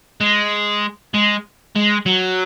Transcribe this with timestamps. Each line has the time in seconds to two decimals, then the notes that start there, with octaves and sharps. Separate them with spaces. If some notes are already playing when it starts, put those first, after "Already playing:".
0.21 G#3
1.14 G#3
1.76 G#3
2.06 F#3